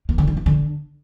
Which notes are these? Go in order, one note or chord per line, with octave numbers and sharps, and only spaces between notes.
A#3
D3
G3
D#3
D3